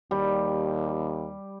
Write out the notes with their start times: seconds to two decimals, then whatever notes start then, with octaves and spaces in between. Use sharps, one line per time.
0.11 D#2 G3